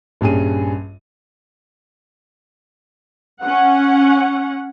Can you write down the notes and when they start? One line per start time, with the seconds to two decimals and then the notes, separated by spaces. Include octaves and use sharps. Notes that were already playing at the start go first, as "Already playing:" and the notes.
0.21 A#1 G2 C#4 G#4 D#7
3.42 C#4 F#5